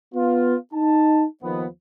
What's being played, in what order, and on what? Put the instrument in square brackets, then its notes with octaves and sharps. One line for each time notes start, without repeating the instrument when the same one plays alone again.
[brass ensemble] B3 F4
D#4 A5
D#2 D#3 F3 B3